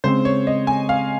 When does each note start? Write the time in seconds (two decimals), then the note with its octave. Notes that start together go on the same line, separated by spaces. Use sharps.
0.04 C#3 G#3 C4 C5
0.25 C#5
0.47 D#5
0.67 G#5
0.89 F5